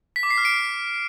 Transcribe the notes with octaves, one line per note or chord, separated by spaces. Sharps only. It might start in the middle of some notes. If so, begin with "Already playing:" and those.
B6
D6
C7
F6
D7